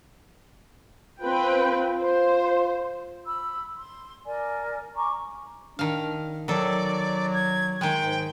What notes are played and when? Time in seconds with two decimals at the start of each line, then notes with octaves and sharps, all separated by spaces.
1.22 C4 F4 B4 G5
2.00 C5
3.26 B5 E6
3.78 C6
4.26 A#4 D5 G#5
4.97 G#5 A#5 C#6 D6
5.79 D#3 D4 F5
6.48 D#3 F#3 A4 D5
7.34 G#6
7.81 D#3 G#3 G5
8.01 G#2